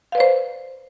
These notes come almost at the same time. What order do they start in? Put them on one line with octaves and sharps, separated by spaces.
F5 B4 D5 C5